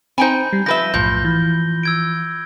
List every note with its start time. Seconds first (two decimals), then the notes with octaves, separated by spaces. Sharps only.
0.18 C4 D#4 C5 G5 G#5 B5 G6
0.53 G3
0.66 F3 B4 E5 G6 A#6 G7
0.94 B1 F#2 A2 F3 G6
1.24 E3
1.83 E6 G#6 D7